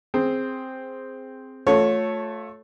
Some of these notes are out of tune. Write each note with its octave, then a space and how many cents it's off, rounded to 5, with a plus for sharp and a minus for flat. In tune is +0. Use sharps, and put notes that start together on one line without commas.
C4 +0 G#4 +0
A3 +0 F4 +35 C#5 +0